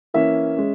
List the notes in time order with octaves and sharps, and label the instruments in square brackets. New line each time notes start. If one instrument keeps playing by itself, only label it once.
[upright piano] E3 A#3 C#4 E5
G#3 C#4